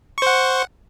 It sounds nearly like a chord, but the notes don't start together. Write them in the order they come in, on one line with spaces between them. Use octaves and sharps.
C#6 C5 F#5